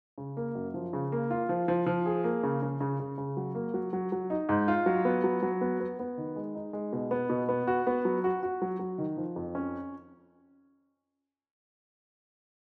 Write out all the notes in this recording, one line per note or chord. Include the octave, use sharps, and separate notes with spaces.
C#3
A#3
F#2
F3
C#3
A#3
F4
F3
F3
F3
G#4
A#3
C#3
C#3
C#3
C#3
C#3
F#3
A#3
F#3
F#3
F#3
D#4
G#2
F4
F#3
B3
F#3
F#3
B3
B3
B3
D#3
G#3
D#4
G#3
B2
B3
B2
B3
F#4
B3
F#3
F#4
F#4
F#3
F#3
D#3
F3
F2
C#4